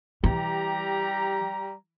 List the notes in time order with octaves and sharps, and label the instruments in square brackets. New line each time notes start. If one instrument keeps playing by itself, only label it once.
[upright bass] E3 [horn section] G3 G4 A#5